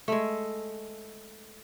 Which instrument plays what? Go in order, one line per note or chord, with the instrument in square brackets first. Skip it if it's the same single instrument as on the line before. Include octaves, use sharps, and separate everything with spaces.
[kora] G#3 A3